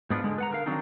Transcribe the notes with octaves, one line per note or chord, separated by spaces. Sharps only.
G#2 B3 D4 D#4 F4
D3 G#3
B4 F#5 A#5
D3 A#4 F5
D#3 F#3 C4 D4 D#4